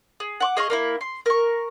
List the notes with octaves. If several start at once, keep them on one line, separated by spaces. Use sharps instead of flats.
G#4
F#5 C#6 D6
G#4 D#5 F5 C#6
A#3 D#4 E4
C6
A#4 C#6